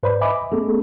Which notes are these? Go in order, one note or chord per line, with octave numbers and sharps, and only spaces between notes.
G#2 B4 C5 D5 B5
D#5 E5 G#5 B5 D6
A3 B3 C#4 G#4 A4